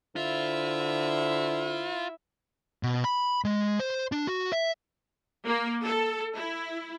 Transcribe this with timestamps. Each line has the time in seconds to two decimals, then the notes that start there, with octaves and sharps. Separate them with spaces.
0.16 D3 E4 F4 C5 E5
2.83 B2
3.04 B5
3.45 G#3
3.79 C5
4.12 D4
4.27 F#4
4.53 E5
5.46 A#3
5.84 A4
6.35 E4